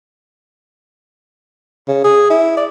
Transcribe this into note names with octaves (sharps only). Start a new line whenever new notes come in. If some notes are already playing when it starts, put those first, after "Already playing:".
C#3
G#4
E4
D5